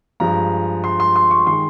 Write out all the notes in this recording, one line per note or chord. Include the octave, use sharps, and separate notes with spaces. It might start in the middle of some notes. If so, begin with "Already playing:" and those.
G2 F3 G#3 A#5
C6
C6
C6
C#6
D#3 G#3 C6